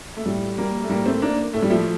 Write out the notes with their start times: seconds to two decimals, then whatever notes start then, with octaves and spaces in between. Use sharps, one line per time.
0.17 A3
0.26 A2 G3
0.58 G3 A#3
0.83 A3
0.89 A2 G3 A#3
1.06 A3 C4
1.22 A#3 D4
1.53 A2 A3
1.62 G3
1.70 F3 A3